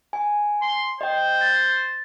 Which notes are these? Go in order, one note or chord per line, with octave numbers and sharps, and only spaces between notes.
G#5
C6
C5 D#5 G5
A6